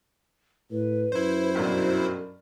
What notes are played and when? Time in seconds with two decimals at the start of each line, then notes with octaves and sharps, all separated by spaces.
0.71 A2 B4
1.12 F#2 E4 C5
1.55 B1 G2 F#3 A#4